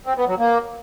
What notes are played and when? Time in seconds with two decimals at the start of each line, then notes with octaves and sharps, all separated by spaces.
0.06 C4
0.17 B3
0.28 F#3
0.39 A#3